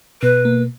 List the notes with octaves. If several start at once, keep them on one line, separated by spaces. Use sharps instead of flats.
B2 B4
A#3